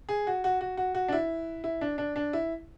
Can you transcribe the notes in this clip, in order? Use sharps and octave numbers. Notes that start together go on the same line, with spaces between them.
G#4
F#4
F#4
F#4
F#4
F#4
D4
E4
E4
D4
D4
D4
E4